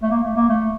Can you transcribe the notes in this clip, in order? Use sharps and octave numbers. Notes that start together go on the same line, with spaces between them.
A3
A#3
A3
A#3
A3